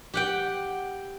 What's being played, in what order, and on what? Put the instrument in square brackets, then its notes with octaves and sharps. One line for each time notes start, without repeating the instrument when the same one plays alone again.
[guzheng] G4 F#5 G5